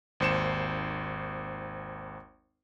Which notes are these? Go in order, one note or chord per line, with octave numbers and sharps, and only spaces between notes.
G#1 D#2 C5 C#7 E7